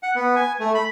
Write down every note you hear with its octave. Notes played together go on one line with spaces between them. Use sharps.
F#5
B3
G#5
A3
B5